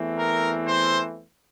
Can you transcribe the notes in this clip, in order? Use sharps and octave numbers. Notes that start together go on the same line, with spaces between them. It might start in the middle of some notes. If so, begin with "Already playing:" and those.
Already playing: E2 E3 A3 C4
A#4
C5